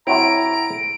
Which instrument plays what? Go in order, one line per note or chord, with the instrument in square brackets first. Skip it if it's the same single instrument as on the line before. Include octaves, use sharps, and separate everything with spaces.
[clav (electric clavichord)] C3 F#3 C4 [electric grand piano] E4 [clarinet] A#5 [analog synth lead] D7